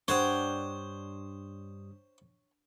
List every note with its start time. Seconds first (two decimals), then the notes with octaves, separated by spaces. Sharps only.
0.08 G2 G3 D4 C5 C#5 F#5 G5 D#6